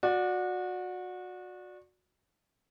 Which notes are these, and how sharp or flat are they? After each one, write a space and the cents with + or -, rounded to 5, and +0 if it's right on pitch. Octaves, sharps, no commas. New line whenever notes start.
F#4 -25 D5 +5